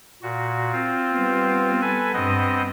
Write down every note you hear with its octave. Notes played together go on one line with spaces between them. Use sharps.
A#2 F#4
C4 F4
G3 B3
A4 B4 G#5
G2 B3 C4 D#5